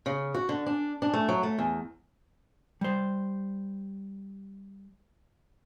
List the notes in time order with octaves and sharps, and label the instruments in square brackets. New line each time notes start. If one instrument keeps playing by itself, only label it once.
[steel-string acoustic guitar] C#3
F#4
D3
D4
D4
A3
F#3
A3
E2
[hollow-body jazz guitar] G3 C5